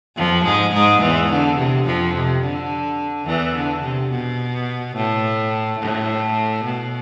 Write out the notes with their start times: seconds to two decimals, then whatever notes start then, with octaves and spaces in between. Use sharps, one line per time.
0.16 F2 F3
0.45 G#2 G#3
0.73 G#2 G#3
1.01 E2 E3
1.30 D3
1.57 C3
1.86 F2 F3
2.14 C3
2.42 D3
3.26 E2 E3
3.55 D3
3.82 C3
4.10 B2
4.96 A2
5.80 A2
6.64 B2